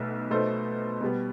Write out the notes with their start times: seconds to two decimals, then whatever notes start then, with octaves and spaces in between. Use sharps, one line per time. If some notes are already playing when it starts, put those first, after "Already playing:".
Already playing: B1 B2 A3
0.30 B2 A3 D#4 A4 C5
1.01 B2 G3 B3